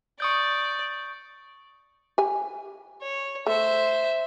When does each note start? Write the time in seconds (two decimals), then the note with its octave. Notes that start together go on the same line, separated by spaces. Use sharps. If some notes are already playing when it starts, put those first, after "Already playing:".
0.20 D5 C#6 D#6 G6
2.18 G4 G#5
3.02 C#5
3.47 A3 C5 E5